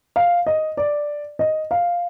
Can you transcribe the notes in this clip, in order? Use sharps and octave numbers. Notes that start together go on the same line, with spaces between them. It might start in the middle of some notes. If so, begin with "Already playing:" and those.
F5
D#5
D5
D#5
F5